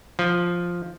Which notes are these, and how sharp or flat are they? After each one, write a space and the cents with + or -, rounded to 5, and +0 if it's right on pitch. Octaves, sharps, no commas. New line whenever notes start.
F3 +0